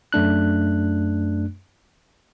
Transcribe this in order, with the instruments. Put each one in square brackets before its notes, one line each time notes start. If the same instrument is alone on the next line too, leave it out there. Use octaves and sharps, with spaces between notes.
[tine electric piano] F#2 A3 D4 F#6